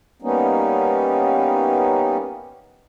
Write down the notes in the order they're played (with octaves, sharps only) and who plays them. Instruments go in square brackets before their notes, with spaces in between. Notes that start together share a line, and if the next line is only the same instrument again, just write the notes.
[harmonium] G3 A#3 B3 C#4 D#4